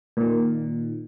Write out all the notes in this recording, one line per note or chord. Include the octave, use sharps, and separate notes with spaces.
A#2 D#3